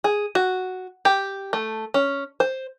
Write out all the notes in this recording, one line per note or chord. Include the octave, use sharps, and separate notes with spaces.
G#4
F#4
G4
A3
C#4
C5